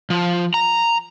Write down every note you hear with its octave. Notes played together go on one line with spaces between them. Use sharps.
F3
A#5